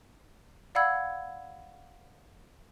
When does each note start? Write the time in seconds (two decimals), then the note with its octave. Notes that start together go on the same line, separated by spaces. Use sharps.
0.75 D5 F5 F#5 B5 E6 G#6